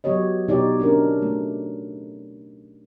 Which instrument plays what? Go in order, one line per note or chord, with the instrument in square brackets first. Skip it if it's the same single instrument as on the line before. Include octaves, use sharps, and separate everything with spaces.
[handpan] F#3 B3 G4 C#5 D#5
B2 D#4 G4 C#5 D5
C#4 D4 A#4
A3